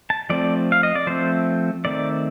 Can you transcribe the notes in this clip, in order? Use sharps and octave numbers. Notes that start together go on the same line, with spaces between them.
A5
F3 A3 C4 D5
F5
D#5
D5
F3 A3 C4 C5
D#3 A3 C4 D5